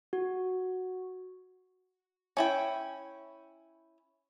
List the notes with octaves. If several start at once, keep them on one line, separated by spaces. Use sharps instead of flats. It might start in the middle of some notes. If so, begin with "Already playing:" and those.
F#4
C#4 E4 G5